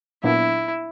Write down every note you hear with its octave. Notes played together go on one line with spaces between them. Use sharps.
A#2 F#3 B3 D4 E4